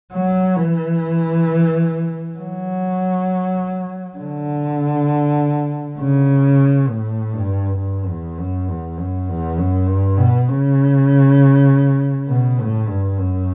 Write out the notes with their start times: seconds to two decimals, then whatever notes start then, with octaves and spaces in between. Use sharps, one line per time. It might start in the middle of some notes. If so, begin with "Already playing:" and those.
0.12 F#3
0.57 E3
2.38 F#3
4.18 D3
5.98 C#3
6.88 A2
7.33 G2
7.78 G2
8.08 E2
8.38 F#2
8.68 E2
8.98 F#2
9.28 E2
9.58 F#2
9.88 G2
10.18 B2
10.49 C#3
12.28 B2
12.58 A2
12.88 G2
13.19 F#2